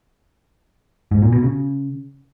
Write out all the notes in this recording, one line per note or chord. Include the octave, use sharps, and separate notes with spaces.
G#2
A#2
B2
C#3